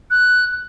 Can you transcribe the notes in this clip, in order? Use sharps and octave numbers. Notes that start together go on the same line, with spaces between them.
F#6